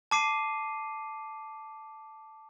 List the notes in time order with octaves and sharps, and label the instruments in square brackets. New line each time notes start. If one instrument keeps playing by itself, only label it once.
[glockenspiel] A5 D6 C7 D#7